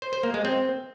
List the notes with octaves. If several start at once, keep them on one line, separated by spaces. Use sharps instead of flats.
C5
C5
A#3
G#3
C4